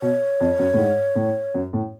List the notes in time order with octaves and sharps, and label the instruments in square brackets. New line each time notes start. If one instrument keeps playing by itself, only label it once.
[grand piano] B2 [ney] C#5
[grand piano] F2
F#2
A2
G#2
A2
F#2
A2